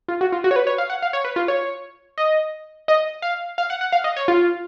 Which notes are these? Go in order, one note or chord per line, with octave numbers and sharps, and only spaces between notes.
F4
F#4
F4
F#4
C#5
B4
C#5
F5
F#5
F5
C#5
B4
F4
C#5
D#5
D#5
F5
F5
F#5
F#5
F5
D#5
C#5
F4